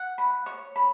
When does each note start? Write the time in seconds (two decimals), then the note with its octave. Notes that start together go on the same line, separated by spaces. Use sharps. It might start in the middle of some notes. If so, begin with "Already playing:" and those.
Already playing: F#5
0.18 B5
0.46 C#5
0.76 B5